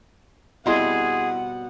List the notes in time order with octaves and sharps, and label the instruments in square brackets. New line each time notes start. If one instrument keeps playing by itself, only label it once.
[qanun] B2 G3 C4 [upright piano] E4 D#5 C6 [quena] G#4 [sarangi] F#5